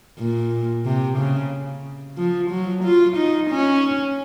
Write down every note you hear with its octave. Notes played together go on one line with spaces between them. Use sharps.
A#2
C3
C#3
F3
F#3
F4
D#4
C#4